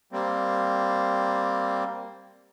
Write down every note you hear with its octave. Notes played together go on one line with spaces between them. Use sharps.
G3 A#3 C4